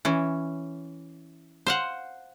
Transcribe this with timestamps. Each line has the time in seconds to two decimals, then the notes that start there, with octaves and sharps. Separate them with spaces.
0.05 E3 C#4
1.67 C5 F5 F#5